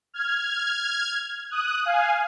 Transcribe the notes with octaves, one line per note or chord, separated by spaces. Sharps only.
F6 G#6
D#6 F#6
F5 G#5